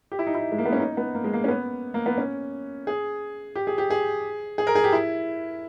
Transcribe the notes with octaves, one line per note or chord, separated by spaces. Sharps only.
G4
E4
D#4
E4
G#3
A#3
B3
C#4
D#4
B3
A#3
G#3
A#3
C#4
B3
A#3
B3
C#4
G#4
G4
G#4
G4
G#4
G#4
A#4
G#4
G4
E4